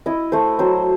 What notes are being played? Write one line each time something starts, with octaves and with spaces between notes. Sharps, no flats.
E4 D#5
A3 C5
F#3 C5